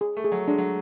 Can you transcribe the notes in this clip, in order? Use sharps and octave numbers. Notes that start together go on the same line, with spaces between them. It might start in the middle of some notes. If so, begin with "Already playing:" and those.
G#4
A3
G#4
F#3
G#3 D4
F#3